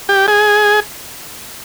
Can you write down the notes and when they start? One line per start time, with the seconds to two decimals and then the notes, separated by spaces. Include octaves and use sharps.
0.09 G4
0.28 G#4